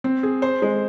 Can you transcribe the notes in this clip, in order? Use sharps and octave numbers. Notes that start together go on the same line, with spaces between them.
C4
G#4
C5
G#3